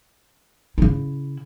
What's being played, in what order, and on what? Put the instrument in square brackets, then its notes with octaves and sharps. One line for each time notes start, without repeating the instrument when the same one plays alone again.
[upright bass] C#3 E4